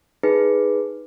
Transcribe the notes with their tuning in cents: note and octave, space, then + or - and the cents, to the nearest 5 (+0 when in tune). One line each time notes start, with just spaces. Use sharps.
D#4 +0 G#4 +0 B4 +0